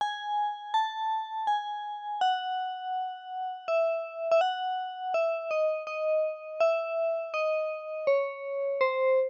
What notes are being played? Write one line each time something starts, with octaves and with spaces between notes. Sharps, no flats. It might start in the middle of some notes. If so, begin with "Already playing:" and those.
G#5
A5
G#5
F#5
E5
E5
F#5
E5
D#5
D#5
E5
D#5
C#5
C5